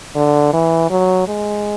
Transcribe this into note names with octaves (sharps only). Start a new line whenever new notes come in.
D3
E3
F#3
G#3